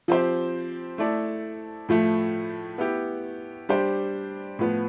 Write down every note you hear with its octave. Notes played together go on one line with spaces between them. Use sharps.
F3 C4 G4 C5
A3 E4 A4 D5
A2 F3 A3
B3 E4 G4
G3 D4 G4 C5
A2 F3 B3